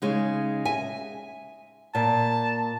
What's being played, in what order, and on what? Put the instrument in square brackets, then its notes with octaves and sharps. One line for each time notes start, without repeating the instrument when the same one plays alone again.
[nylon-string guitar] C#3 G#3 D#4
E5 G#5
[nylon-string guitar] A#2 [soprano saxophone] A5